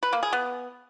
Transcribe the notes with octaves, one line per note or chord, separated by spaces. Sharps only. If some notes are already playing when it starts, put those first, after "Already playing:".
B4
A#3
G#4
B3